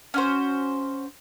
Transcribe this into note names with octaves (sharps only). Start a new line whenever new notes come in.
C#4 F#4 C5